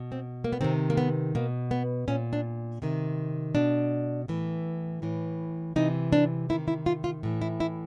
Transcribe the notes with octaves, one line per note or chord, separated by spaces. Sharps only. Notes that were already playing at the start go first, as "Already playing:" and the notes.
Already playing: B2
C4
A#3
B3
C3 D#3 C4
A#3
B3
B2 A#3
B3
A#2 C#4
D4
C3 D#3
B2 D4
A2 E3
A2 E3
C3 E3 D#4
D4
C3 D#3 E4
E4
F4
F4
A2 E3
E4
E4